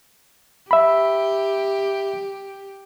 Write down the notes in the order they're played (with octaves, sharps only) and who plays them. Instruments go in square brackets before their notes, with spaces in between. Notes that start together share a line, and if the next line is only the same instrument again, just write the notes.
[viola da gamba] G4 [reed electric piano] E5 B5